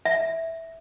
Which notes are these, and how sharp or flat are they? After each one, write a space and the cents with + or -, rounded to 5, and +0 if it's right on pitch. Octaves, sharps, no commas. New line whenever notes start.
E5 -5